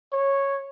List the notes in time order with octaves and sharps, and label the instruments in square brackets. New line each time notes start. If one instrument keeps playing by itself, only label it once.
[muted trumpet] C#5